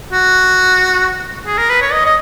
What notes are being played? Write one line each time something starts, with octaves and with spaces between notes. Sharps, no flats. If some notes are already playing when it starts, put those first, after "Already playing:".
F#4
G#4
A#4
B4
C#5
D#5
D#5